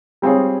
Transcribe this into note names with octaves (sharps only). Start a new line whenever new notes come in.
G3 C4 F4 G#4 C#5